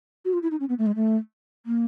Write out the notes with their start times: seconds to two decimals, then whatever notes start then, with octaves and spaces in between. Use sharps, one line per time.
0.25 F#4
0.33 F4
0.42 E4
0.51 D#4
0.60 C#4
0.69 B3
0.78 A3
0.86 G#3
0.95 A3
1.66 A#3